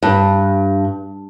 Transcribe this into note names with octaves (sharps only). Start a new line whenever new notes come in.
G2